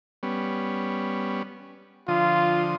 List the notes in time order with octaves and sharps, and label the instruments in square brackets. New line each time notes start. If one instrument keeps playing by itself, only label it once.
[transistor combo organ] G3 B3 C#4
[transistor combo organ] D3 F3 D#6 [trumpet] F4